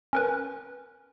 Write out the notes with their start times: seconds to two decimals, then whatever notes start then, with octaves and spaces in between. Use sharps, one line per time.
0.13 C#4 A#4 B4